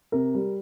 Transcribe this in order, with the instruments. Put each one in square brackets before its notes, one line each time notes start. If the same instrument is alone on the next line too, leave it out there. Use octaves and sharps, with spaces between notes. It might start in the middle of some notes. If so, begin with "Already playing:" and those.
[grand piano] C3 A#4
G3